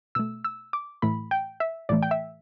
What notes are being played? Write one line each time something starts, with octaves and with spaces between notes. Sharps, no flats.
B2 A3 E6
E6
D6
A2 E3 A3 B5
G5
E5
A2 E3 A3 D5
G5
E5